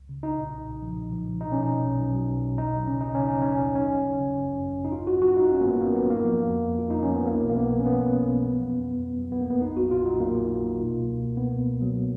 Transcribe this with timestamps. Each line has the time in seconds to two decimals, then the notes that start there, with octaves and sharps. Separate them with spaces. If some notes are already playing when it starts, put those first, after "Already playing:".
Already playing: C#2
0.09 C#3
0.23 B1 D#4
0.38 A#2
0.52 B1
0.67 B1
0.82 F3
0.96 A#2
1.12 F3
1.26 A#2
1.41 B2 D#4
1.52 B2 C#4
1.63 D#4
1.70 B2
1.85 B1
2.00 F#3
2.14 F#3
2.29 B1
2.43 B2
2.58 D#2 D#4
2.73 D#2
2.87 C#3 C#4
3.01 D#2 D#4
3.15 C#3 C#4
3.28 F#3 D#4
3.42 D#2 C#4
3.61 D#2
3.75 F#3 C#4
3.90 G#1
4.04 C#3
4.19 C#3
4.34 F#2
4.48 F#2
4.64 G#1
4.78 G#1
4.85 D#4
4.92 G#2 F4
5.07 G#1 F#4
5.22 F#3 F#4
5.36 G#2 D#4
5.51 G#1 C#4
5.61 A#3
5.65 G#2 B3
5.80 G#1 A#3
5.95 F#3 B3
6.10 F2 A#3
6.24 F3
6.39 F2
6.54 F2
6.69 F2
6.79 F2 F4
6.90 D#4
6.98 F3 C#4
7.13 F3 B3
7.27 B1 A#3
7.42 B2
7.49 A#3
7.56 B1 B3
7.71 B2
7.79 C#4
7.85 B1 B3
8.00 B1
8.15 B1
8.29 B2
8.44 F#3
8.59 F2
8.73 F2
8.88 F2
9.03 F2
9.18 F#3
9.31 F2 B3
9.41 A#3
9.47 F2 B3
9.61 A#1 D#4
9.76 A#1 F#4
9.91 A#2 F4
10.05 F#3 D#4
10.20 F#3 A#3
10.35 A#2
10.49 A#1
10.64 F#3
10.79 B2
10.94 C#2
11.08 B2
11.23 B2
11.37 C#2 B3
11.52 B2
11.67 B2
11.81 F#3